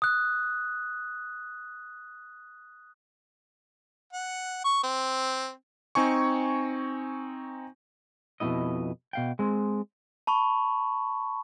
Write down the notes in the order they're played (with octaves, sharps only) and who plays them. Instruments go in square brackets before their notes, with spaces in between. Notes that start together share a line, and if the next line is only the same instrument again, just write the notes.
[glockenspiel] D#6 F#6
[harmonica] F#5
C#6
C4
[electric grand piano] C4 D#4 G#5 C#6
[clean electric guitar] F2 B2 F#3 G#3 E4 D#5
B2 F5 G5
G#3 C4
[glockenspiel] A5 B5 C#6